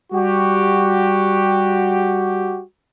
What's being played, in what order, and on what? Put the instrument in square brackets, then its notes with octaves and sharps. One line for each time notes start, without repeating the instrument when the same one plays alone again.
[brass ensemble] G3 F#4 G4